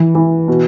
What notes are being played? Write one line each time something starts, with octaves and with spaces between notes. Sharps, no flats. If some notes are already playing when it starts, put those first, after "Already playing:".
Already playing: E3
E3
B2